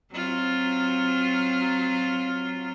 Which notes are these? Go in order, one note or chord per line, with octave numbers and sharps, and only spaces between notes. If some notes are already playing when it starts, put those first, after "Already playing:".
F#3 C4 F4